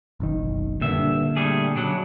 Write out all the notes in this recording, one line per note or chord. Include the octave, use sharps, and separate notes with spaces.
F#1 B1 D#3
G2 A#2 D3 E5
G3 A3 G#4
C#3 F#3 D4